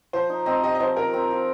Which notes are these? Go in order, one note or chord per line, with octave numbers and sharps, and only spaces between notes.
F3 C5
D#4
C4 D#5
G4 D#5
D#5
F3 C5
A#3 A#4
C4
F4